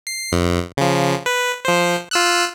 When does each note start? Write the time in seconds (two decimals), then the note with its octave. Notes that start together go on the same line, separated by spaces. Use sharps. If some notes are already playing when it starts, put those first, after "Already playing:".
0.07 C7
0.32 F2
0.77 C#3 F3
1.26 B4
1.65 F3 C5
2.11 F4 E6 F#6